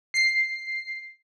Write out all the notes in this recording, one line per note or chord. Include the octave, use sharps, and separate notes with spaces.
C7